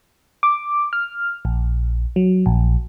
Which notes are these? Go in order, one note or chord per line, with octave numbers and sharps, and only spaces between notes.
D6
F6
A#1
F#3
A#1